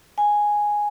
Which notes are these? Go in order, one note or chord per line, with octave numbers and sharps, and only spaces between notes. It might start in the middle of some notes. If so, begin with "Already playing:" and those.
G#5